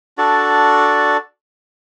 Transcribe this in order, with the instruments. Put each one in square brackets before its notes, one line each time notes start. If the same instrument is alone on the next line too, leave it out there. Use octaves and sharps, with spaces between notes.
[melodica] D4 F#4 A4 D5